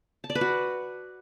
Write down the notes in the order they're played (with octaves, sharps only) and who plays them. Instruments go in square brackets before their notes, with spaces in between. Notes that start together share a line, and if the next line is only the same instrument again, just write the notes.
[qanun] A5
D5
B4
F#4